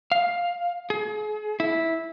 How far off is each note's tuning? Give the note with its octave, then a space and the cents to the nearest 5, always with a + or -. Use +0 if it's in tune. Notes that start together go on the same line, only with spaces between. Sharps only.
F5 +10
G#4 +40
E4 -10